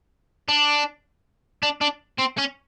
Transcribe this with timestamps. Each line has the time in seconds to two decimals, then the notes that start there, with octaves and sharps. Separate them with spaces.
0.48 D4
1.63 D4
1.81 D4
2.19 C4
2.39 C#4